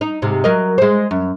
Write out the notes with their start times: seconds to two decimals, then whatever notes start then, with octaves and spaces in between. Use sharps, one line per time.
0.01 D#4
0.22 G#2 C3
0.44 F#3 A#4 D#5
0.78 G#3 C5
1.11 F#2